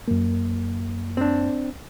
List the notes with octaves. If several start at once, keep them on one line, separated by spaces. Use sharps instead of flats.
F#2 A#3
C4 D4